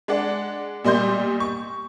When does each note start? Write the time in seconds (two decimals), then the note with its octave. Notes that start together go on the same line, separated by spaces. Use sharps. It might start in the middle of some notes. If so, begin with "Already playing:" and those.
0.08 G#3 D4 D5 F#5
0.84 A#2 G3 D#5 C6 G6
1.40 C#6